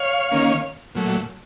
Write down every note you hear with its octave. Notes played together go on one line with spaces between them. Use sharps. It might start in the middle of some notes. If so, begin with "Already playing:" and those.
Already playing: C#5 F5
D#3 A#3 C#4
A#2 F#3 A3